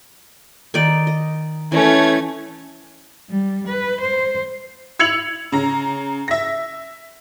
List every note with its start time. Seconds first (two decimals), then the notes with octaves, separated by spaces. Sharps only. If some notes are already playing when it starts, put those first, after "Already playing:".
0.74 D#3 D#4 D5
1.07 D#5
1.72 E3 A3 C#4 G#6
3.30 G3
3.68 B4
4.01 C5
4.99 E6 G#6 C#7 F7 F#7
5.52 C#3 A#5
6.28 E5 A#6